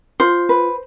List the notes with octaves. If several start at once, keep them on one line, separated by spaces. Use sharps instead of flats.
F4 C5
B4